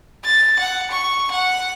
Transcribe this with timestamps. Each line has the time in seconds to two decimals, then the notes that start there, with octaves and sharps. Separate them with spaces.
0.24 A6
0.59 F#5
0.91 C#6
1.31 F#5